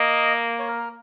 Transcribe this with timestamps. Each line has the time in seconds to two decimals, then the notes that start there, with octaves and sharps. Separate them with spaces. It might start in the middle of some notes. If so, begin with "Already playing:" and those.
Already playing: A#3 D#5
0.59 C#5
0.68 A#4